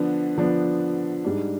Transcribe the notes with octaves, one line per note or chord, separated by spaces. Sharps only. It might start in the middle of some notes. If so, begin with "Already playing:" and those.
Already playing: D3 F3 B3 D4
D3 F3 B3 D4
G#2 G3 D4